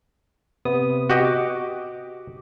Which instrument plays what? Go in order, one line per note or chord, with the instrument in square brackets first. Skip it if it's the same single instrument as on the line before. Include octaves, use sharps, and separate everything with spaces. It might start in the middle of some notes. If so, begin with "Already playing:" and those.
[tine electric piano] C3 B3 D#6
[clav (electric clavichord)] F#4 G4 D#5
[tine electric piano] D6